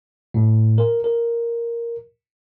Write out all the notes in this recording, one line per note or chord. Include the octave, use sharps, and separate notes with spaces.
A2
A#4
A#4